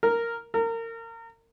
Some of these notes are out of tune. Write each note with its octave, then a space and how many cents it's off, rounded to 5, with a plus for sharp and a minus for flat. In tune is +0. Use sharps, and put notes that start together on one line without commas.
A#4 -5
A#4 -30